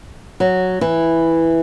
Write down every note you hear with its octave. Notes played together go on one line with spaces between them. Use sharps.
F#3
E3